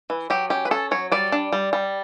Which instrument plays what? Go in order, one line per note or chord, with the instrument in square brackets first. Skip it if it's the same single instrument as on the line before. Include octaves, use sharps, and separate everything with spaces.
[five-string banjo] E3
F#3 G4
C#4 G4
B4
C#4 A4
F#3 C#5
G3 D5
D4
G3
G3